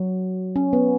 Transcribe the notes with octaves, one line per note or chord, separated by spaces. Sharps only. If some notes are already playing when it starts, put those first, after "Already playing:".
Already playing: F#3
C#4
B3